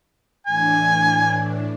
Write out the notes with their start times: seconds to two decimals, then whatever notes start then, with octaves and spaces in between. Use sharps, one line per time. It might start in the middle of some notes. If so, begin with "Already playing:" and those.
0.47 A2 E3 D4 G#5